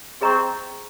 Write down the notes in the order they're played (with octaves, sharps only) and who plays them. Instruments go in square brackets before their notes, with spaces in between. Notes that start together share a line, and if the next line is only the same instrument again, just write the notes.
[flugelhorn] C4 [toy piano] G#4 D#5 A#5 C#6